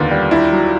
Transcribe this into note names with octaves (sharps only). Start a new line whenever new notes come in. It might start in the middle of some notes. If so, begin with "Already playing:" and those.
Already playing: D#2 D3 B3 F4
G3
D4 E4
F#3